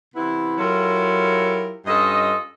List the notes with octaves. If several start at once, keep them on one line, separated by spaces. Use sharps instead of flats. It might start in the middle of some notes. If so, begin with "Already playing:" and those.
C3 E3 B3 E4
F#3 E4 F4 G4 A4 A#4
G2 C#4 F4 A4 D#5